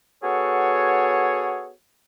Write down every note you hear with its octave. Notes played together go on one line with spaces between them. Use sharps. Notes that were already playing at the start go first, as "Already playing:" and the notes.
B3 F#4 G#4 A4 C#5